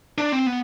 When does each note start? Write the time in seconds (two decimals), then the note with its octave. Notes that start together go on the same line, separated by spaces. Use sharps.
0.18 D4
0.32 C4
0.46 B3